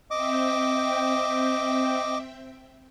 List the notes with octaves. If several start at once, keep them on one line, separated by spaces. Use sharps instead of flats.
C4 D#5 E5 G5 D6